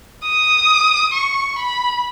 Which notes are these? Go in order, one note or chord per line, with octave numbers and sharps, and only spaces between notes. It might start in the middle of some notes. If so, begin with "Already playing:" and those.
D#6
C#6
B5